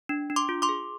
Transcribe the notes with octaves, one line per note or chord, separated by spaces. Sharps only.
D4
D4
C6 D6
F4
C6 D6
G#4